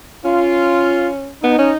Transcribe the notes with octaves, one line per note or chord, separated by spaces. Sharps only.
C#4 F4
B3 D#4
C#4